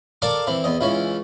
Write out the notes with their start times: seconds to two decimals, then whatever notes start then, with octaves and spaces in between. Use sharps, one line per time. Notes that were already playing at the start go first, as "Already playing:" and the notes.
0.22 A4 A#4 D5 F5 A5 A#5
0.47 E3 C4
0.64 E2 D#5
0.81 C#2 E3 C#4